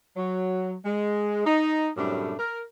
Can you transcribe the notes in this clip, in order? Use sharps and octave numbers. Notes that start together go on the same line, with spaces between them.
F#3
G#3
D#4
F#2 A2 C3 G3 A3 D4
A#4